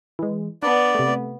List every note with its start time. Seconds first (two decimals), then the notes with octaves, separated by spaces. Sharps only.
0.19 E3 G#3
0.63 B3 D4 D5
0.95 C3 A3